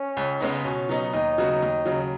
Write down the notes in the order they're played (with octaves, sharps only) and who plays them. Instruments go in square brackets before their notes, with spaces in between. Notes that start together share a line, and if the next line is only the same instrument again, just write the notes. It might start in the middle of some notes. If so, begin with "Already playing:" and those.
Already playing: [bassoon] C#4
[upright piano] C#2
C#3 G#3 B3 D#4
[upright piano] B2 [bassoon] C#4
[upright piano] F#3 B3 D#4
[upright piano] D#2 [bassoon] D#4
[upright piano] C#3 F#3 B3 F#4
D#2
C#3 F#3